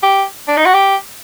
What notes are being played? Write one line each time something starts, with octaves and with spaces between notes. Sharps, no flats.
G4
D4
D#4
F#4
G4